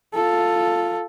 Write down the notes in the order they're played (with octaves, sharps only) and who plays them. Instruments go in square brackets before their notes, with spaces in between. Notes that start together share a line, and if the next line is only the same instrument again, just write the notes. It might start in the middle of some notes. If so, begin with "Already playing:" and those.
[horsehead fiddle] F4 A4